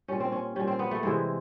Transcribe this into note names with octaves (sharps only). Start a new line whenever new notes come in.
A#2 G3 C#4
C4
C#4
A#2 G3 C#4
C4
B3
A3
C3 E3 G3 G#3